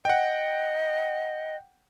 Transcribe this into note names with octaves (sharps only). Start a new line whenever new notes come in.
D#5 F#5 G5